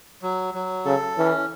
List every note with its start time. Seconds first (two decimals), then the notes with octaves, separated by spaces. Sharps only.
0.22 F#3
0.54 F#3
0.85 C#3 A4
1.18 E3 C#4